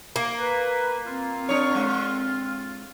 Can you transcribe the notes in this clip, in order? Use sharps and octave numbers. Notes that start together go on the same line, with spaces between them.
A#3
B4
C4 F4
D4 C#5
G#3